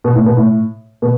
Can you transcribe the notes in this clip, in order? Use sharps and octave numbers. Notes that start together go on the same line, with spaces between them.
B2
A2
B2
A2
B2